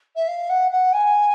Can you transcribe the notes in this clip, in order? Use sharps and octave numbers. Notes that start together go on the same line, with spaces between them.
E5
F5
F#5
F#5
G#5